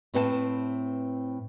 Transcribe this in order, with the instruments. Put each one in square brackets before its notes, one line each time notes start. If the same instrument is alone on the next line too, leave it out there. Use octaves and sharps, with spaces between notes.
[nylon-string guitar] A2 C4 B4 F#5 A5